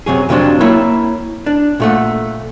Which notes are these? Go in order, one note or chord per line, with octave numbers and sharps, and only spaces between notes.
F#2 C3 F#3 G#4
F2 C3 F3 F#3 D4
A#3 E4 C#5 G5
D4
A#2 A3 F#5